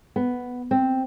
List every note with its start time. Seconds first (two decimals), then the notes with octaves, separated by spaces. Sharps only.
0.16 B3
0.71 C4